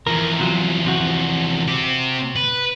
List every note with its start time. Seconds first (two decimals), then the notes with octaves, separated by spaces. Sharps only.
0.07 E2 F3 A#4
0.39 C3 F#3 F4
0.86 C3 F#4
1.68 C4 G4
2.36 B4